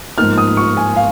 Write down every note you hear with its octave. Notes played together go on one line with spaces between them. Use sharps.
G#2 F3 A#3 D#4 F6
D#6
C#6
G#5
F5